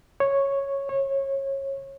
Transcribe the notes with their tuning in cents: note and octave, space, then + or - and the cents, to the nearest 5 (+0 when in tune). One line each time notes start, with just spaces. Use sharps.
C#5 -5
C#5 -25